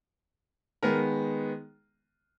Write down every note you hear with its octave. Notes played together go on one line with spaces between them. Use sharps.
D#3 G#3 B3 A#4